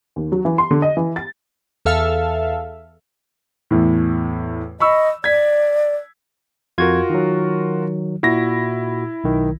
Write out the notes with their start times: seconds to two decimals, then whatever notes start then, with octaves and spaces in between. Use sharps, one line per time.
0.16 D#2
0.32 F#3
0.45 E3
0.58 C6
0.71 D3
0.82 D#5
0.97 E3
1.16 A6
1.85 E2 A4 E5 F5 F6
3.71 E2 A2
4.80 D#5 B5 C#6 E6
5.24 D5 G#6 B6
6.78 F2 F4 F#4 A#4 G#6
7.10 D#3 F#3
8.23 A#2 E4 F#4 A#6
9.24 B1 D#3